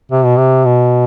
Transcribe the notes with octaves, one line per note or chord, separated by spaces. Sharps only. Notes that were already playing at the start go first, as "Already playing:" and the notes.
C3
B2
C3
B2